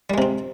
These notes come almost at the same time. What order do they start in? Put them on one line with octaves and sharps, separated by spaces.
G3 G#3 C3 C4